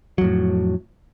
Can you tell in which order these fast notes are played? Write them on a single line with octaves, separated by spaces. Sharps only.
F#3 F2 A2